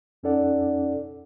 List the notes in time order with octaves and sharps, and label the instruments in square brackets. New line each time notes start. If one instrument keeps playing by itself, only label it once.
[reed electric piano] F2 C#4 D#4 A4 D5 F#5